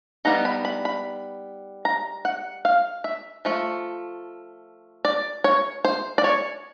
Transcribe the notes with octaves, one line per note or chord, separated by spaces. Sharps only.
G3 B3 D#4 A#5
B5
B5
B5
A#5
F#5
F5
E5
F3 A3
D5
C#5
C5
D5
C#5